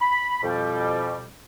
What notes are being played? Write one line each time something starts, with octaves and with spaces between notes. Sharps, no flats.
B5
F2 B2 G3